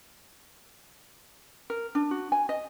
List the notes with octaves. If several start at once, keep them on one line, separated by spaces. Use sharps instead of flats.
A#4
D4
F#4
G#5
D#5